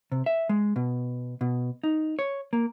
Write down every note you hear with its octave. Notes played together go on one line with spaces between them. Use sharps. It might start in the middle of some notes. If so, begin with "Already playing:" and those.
C3
E5
G#3
B2
B2
D#4
C#5
A#3